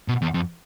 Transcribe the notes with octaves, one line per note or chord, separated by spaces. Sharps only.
B2
E2
F2